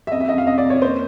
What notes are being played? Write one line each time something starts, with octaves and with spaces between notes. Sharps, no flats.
E5
F2 D#5
E5
F2 D#5
F5
C3 D#5
D5
F2
C#5
A#3 C5